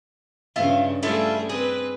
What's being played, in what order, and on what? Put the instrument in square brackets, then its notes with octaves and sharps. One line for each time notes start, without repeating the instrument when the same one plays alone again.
[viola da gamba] G2 C#3 [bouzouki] E4 F4 F5
[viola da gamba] G3 A3 G#4 [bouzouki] E4 F4 A4
[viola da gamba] C4 B4 [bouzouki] G#4